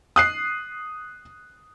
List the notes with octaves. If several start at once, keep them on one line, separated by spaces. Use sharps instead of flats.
D#6 F#6 C7